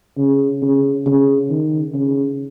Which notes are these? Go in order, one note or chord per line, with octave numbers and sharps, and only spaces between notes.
C#3
C#3
C#3
D#3
C#3